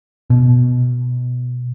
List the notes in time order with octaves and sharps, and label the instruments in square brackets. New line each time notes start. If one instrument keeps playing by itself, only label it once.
[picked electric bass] B2